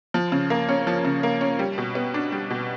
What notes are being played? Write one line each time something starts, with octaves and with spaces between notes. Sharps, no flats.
F3
C#3
A#3
C#4
F3
C#3
A#3
C#4
G3
B2
B3
D4
G3
B2